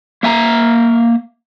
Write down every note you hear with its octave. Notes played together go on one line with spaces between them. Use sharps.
A#3 E5 G#5 A#5